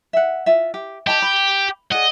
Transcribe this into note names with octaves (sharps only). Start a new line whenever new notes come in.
E5 F#5
F4 E5
G4
G4 D#5 A5 B5
B5
G#4 D5 D#5 F#5